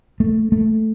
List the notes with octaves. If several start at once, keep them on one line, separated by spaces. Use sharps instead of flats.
A3
A3